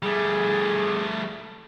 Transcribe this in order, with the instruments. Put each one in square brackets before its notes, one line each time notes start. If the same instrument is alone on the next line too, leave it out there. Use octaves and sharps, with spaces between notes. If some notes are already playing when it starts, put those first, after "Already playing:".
[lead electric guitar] G3 A3 [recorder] G#4